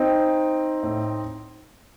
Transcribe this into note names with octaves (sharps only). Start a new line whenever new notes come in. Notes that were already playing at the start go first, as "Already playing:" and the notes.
Already playing: C4 D#4
A2